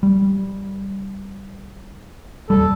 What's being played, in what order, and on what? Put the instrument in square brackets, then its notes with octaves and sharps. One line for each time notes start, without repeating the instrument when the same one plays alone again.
[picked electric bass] G3
[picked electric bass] D#1 D#2 G3 [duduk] A4